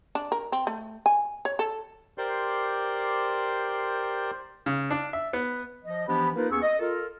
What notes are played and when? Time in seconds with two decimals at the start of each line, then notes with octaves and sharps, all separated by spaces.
0.15 D4
0.32 A#4
0.52 C4
0.67 A3
1.06 G#5
1.45 C#5
1.59 A4
2.18 G4 A#4 C5 D5 C6
4.66 C#3
4.91 D4
5.13 E5
5.33 B3
5.85 F3 D#5
6.08 E3 F3 B3 D4 G4 B5
6.35 A#3 D#4 F4 A#4 B4
6.51 D#2 B3 C#4 G#4 C#6 E6
6.62 D#5
6.79 F4 A4 A#4